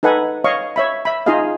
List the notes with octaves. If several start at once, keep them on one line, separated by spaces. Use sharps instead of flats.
D#4 A4 B4 F#5 G#5
C#5 D#5 F5 C#6
C#5 E5 B5
E5 B5
D#4 F4 G#4 D#5 F5